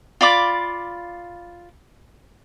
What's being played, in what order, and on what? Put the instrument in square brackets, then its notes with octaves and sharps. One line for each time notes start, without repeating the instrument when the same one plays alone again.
[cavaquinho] F4 D5 B5 D6